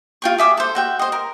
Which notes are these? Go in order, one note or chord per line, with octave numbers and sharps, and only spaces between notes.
F4 G5 C#6
G#4 E5 D6
A4 C5
F#4 E5 G5
C5 D#5
A#4